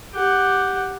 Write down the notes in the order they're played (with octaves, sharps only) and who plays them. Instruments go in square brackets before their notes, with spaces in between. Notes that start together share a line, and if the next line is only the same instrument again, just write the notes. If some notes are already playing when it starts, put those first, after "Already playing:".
[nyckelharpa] G4 F#5